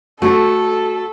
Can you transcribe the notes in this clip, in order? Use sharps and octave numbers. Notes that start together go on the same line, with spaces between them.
A3 F#4 A4